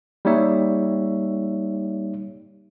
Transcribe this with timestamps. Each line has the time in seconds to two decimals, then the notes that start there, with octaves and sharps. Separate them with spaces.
0.25 G3 A#3 D#4 C#5 E5